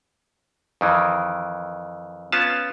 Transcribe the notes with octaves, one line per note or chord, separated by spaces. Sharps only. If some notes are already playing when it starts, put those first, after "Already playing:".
F2 D#3 E3
B3 C#4 F4 A5